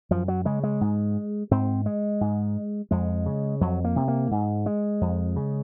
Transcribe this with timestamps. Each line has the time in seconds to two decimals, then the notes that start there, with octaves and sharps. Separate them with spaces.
0.11 F#2 F3
0.28 F#3
0.45 C#3 G#3
0.63 G#3
0.81 G#2
1.51 G#2 C4
1.86 G#3
2.21 G#2
2.91 F2 G#3
3.26 C#3
3.61 F2 F#3
3.85 A#3
3.96 C3
4.08 A#3
4.31 G#2
4.66 G#3
5.01 F2
5.36 C#3